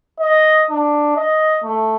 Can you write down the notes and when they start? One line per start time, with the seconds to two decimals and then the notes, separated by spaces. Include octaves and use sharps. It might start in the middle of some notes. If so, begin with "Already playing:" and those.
0.20 D#5
0.71 D4
1.16 D#5
1.64 A3